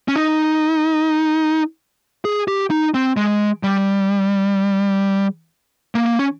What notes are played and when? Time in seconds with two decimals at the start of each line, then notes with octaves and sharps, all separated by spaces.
0.08 C#4
0.16 D#4
2.25 G#4
2.48 G4
2.71 D#4
2.94 C4
3.17 G#3
3.63 G3
5.95 A#3
6.19 C#4